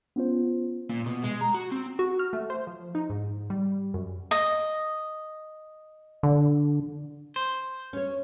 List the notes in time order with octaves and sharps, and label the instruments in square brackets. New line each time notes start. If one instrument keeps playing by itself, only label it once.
[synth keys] B3 C#4 F4 C5
[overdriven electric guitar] A#2
B2
G#3
A#5
F#4
C4
[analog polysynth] F#4
F6
A3
C5
F3
D#4
G#2
G3
F#2
[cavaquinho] D#5
[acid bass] D3
[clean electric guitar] C5
[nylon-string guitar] C#4 C#5